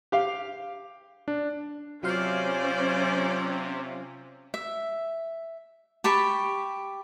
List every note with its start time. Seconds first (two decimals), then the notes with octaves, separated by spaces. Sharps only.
0.12 G4 F5
1.28 D4
2.03 C3 F#3 C#4 F4 C5 D5 F5
4.54 E5
6.04 G4 A5 B5 C#6